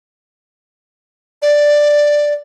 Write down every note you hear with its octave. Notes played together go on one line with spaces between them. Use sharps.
D5